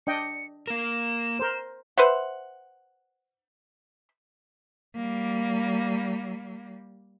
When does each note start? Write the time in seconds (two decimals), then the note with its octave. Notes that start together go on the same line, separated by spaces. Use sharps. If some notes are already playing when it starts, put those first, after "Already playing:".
0.07 D4 D#5 G5 C#7
0.67 A#3 A#4 E7
1.39 A#4 C5
1.97 B4 C5 E5 F#5
4.96 G3 A#3